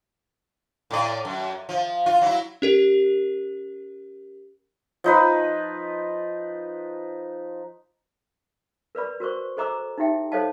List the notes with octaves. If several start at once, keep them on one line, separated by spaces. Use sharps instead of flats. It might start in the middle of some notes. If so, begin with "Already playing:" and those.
A2 D5
F#2
F3
F4
F#3 E4
C#4 G4 A#4
F3 D#4 B4
A#4 B4 D5 B5
F#4 A#4 C5 C#6
A4 C5 D#5 A#5 D6 E6
D#4 E4 G4 E5 G5
A4 C5 C#5 D#5 F5 A5